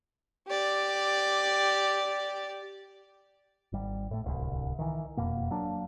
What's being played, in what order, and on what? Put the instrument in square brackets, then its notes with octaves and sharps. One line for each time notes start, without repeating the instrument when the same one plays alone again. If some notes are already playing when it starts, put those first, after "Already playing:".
[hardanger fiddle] G4 D5
[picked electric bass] G#1 G3
A2 A3
D1 C2
D#3 E3
E1 F2 B2 A#3
F#3 A#3 D4